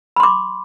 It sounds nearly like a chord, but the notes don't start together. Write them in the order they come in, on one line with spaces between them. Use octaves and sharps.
B5 C6 D6